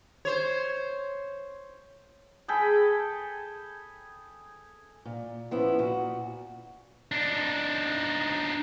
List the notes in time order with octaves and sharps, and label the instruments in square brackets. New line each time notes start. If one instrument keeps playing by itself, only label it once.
[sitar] C5 C#5
[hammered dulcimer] G#4 A4 G5 B5
[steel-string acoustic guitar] A#2
F3 B3 C#4 E4
A#2 F#4
[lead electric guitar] D4 D#4